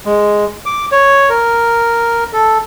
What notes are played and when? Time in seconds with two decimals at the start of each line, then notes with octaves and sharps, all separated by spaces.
0.06 G#3
0.66 D6
0.92 C#5
1.30 A#4
2.33 A4